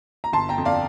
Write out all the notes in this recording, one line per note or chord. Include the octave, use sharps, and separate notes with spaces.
A#5
G1 A5 C6
G5 A#5
F2
D5 F5